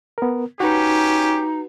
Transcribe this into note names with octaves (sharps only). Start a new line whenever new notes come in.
B3 A#4
C#4 D#4 F#4 G4 B4